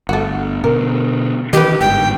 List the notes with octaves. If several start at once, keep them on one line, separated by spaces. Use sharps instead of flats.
G1 A3 F#4
B2 D3 A#4
D#3 E3 D4 G4 B4 D#5
G1 G#2 G5